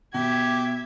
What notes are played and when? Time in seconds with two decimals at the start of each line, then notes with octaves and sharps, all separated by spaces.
0.14 B2 G4 E5 G#6